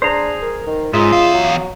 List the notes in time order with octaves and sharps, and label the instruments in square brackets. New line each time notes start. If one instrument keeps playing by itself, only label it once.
[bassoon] D4 [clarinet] G#4 [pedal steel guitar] C5 A#5
[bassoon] A#4
D#3
[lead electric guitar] G#2 [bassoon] C#3 [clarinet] F4 [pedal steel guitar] D#5 E5
[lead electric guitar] E2 F5
[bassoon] F#3